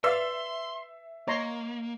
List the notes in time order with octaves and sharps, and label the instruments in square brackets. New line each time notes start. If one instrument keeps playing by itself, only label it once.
[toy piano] B4 [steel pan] D5 F5 [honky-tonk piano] E5 E6 C7 [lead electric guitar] C6
[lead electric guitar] A#3 [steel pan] C#5 A#5 C6 [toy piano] D#5